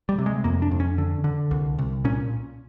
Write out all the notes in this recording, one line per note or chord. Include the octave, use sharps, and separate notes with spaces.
G3
C3
G#3
F2 A#3
D4
F2
C#4
D3
D3
C2
C2
A#2 C#4